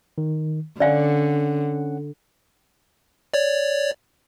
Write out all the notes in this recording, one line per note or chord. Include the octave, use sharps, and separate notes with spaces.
D#3
D3 C#4 D5 F5 F#5 G#5
C#5 D5